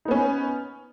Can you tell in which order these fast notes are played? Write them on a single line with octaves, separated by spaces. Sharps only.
D#4 B3 C#4